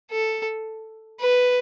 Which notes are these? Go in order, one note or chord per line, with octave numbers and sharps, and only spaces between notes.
A4
B4